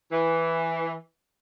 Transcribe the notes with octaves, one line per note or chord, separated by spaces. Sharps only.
E3